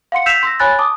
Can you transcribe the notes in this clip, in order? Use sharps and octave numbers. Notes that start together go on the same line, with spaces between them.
F5 F#5 C6 C#7
E6 G6 B6 C7 E7 F7
C6 E6 A#6
C#5 G#5 B5 F#6 A6
A5 D6 D#6